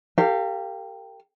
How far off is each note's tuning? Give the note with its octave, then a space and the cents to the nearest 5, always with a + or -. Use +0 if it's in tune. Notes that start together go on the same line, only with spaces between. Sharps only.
G4 +5 A#4 -40 F5 +0